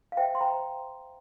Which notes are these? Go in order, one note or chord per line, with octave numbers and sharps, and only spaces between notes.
F5
C5 E5 G5
C6
C5 G5 A#5